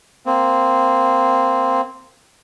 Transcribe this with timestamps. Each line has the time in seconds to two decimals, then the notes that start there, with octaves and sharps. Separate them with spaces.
0.26 A#3 C4